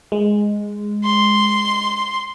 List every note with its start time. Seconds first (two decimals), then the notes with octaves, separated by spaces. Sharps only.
0.12 G#3
1.04 C6